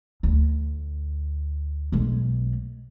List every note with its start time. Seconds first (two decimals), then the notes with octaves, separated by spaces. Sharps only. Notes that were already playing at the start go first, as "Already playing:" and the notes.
0.23 D2
1.92 B1 G#3